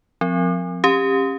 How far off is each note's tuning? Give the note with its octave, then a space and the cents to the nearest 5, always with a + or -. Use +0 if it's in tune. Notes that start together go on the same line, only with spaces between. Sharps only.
F3 +25 C4 +0
C#4 -25 G4 +20